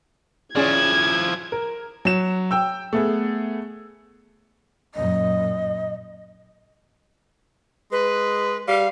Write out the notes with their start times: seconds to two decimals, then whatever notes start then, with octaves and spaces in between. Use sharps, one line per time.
0.56 F3 C#4 E4 G#4 D5 G#6
1.52 A#4
2.05 F#3 E7
2.51 G5 E6
2.93 A3 B3 G#4
4.95 F#2 A#2 D#5
7.92 G#3 B4
8.68 G3 F5